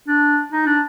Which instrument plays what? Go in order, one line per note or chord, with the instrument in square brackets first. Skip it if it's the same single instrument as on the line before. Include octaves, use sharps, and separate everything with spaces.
[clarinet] D4
D#4
D4